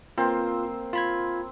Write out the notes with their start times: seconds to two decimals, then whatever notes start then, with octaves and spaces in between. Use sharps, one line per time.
0.18 A#3 C4 F4
0.93 F4 B5 G#6